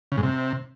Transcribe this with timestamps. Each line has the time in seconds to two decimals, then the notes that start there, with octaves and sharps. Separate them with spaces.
0.12 C#3
0.17 G#2
0.23 C3